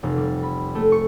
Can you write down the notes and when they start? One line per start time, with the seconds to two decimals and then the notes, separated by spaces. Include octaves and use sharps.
0.03 F1
0.17 G3
0.43 B5
0.75 A3
0.92 C#6